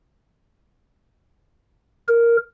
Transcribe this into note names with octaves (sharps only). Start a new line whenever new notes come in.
A#4